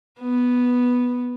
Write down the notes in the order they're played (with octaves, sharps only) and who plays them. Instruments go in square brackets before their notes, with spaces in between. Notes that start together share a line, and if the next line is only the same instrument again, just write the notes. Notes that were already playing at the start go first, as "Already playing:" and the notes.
[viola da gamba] B3